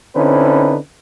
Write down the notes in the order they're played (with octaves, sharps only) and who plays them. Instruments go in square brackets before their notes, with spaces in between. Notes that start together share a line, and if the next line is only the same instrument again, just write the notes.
[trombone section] D3 C4 C#4 D#4 E4 B4